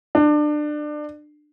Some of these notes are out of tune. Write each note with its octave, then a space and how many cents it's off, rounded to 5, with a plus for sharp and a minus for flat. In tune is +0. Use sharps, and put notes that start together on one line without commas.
D4 +25